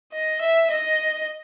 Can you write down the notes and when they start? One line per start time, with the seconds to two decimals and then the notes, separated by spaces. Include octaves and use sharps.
0.13 D#5
0.41 E5
0.70 D#5